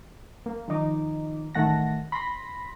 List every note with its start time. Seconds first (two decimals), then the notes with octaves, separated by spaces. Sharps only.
0.46 A#3
0.68 D#3 F3 D#4 D6
1.55 A1 D#3 A3 F#5 A5 A#6
2.12 B5 C6 A#6 B6